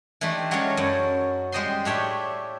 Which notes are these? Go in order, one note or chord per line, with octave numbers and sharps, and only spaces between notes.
E3 A3 D4 D#4 G4 C6
F#3 G#3 C#4 A4 A#4 C#5
F#2
G3 G#3 C5 D#5 G5 C6
A2 D4 G4 C#5 E5 G5